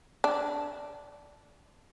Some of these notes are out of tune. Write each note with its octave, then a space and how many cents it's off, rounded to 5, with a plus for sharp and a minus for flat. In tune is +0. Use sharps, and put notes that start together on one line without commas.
D4 -10